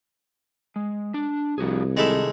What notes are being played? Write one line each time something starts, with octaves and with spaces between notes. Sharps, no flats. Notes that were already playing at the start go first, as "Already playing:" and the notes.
G#3
D4
C2 F3 F#4 G#4
C3 D#3 G#3 A3 E4